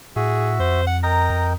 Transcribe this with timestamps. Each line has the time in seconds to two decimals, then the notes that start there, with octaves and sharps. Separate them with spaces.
0.16 A2 F#4 G#4 E5
0.60 F2 C5
0.87 F#5
1.03 A#4 D#5 G5 A#5
1.30 F2